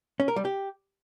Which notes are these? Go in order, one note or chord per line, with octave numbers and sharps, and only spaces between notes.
C#4
A#4
G3
G4